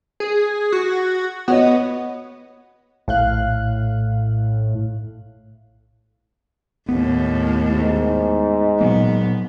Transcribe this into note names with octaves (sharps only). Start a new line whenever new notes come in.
G#4
F#4
B3 F#4 C#5 D#5
A#1 A2 F5 F#6
D#2 A2 B3
G#2
A#2 F#3 A#3 B3